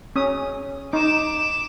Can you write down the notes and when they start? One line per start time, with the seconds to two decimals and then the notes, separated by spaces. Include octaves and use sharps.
0.16 C#4 D#6
0.93 D#4 D6 E7